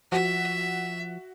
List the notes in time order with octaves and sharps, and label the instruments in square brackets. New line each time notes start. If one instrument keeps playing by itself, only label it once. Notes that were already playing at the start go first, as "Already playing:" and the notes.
[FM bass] F3 [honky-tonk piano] F#4 [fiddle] E5